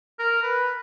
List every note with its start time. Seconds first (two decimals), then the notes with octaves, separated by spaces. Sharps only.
0.19 A#4
0.43 B4